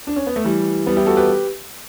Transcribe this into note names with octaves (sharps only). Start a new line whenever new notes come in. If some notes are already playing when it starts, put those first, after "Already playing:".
D4
C#4
B3
A3
E3 G3
G3 B3
E4 G4
F#4 A4
G4 B4